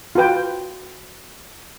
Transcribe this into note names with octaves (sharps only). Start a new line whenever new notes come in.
F4 F#4 B4 G5